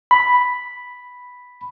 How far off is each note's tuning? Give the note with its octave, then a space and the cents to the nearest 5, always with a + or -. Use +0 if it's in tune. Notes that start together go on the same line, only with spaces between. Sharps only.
B5 +0